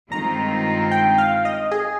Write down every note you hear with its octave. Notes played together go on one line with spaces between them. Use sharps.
G2 D#3 G#3 C4 F4 A#5
G5
F5
D#5
G#4